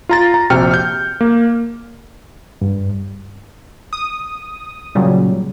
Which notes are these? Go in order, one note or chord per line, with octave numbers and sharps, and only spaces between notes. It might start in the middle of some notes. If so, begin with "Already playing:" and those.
F4 A#5 A6
A#5
A#1 C3 F#4 G5 F6 C#7
F6 G6
A#3
G2
D#6
A#2 C#3 F#3 G3